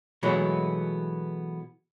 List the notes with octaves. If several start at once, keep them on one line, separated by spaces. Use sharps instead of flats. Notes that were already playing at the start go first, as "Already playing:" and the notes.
B2 E3 F#3 G#3 A3 B3